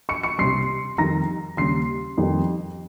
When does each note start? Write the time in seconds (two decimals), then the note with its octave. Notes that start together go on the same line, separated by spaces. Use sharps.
0.09 C#6 C#7
0.23 C#6 C#7
0.38 C2 C3 G3 C6 C7
0.98 F2 D#3 G3 A#5 A#6
1.57 D#2 C#3 G3 C6 C7
2.18 F2 D#3 G3